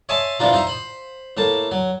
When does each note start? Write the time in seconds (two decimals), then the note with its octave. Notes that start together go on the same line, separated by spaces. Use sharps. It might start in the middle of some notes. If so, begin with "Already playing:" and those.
0.09 C#5 D#5 E5 G#5 A5 C6
0.39 C3 E3 F3 D4 F4 A#5
0.53 D#4 C5 E5 A#5
0.67 C5 B5
1.37 A2 A#3 A5
1.71 F#3